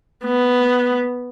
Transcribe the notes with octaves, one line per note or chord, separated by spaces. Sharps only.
B3